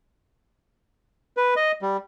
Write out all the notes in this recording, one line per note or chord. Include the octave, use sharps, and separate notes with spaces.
B4
D#5
G3